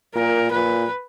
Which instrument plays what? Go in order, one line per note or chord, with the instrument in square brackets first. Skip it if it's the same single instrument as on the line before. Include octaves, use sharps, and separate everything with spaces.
[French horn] A#2 [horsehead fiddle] A#4
[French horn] A#2 [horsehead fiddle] B4